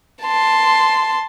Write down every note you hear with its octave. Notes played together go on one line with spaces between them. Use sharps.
A5 C6